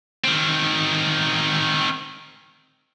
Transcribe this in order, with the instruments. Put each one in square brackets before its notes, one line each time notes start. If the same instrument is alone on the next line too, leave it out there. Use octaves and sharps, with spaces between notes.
[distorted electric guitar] D#3 C4